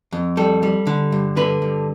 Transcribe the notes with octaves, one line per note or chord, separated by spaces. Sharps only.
F2
G3 A4
G3
D3
G2
D3 B4
G2